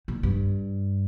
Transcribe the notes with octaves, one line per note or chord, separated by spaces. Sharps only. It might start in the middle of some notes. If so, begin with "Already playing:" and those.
A#2
G2